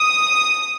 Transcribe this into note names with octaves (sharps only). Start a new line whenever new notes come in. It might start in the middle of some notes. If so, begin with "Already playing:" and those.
Already playing: D#6